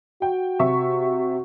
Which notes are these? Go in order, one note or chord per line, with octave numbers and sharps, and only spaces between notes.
F#4 G5
C3 E5 C#6